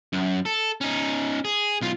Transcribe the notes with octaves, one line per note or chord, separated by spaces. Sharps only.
F#2
A4
C#4 D#4
G#4
B1 F4